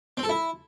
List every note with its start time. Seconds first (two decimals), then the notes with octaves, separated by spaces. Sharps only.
0.17 C4
0.23 A4
0.29 E4